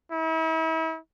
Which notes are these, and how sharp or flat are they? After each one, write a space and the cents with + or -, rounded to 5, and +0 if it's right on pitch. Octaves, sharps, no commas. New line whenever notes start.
E4 -40